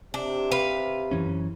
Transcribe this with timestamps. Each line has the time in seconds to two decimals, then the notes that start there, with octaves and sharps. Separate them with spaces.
0.14 C3 D4
0.52 B4 F5
1.11 F#2 E3 C#4